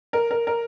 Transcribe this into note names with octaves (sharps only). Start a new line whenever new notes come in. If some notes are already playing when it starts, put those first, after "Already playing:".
A#4
A#4
A#4